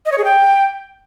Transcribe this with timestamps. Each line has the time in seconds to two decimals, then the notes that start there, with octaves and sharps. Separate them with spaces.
0.06 D#5
0.12 C#5
0.18 G#4
0.24 G5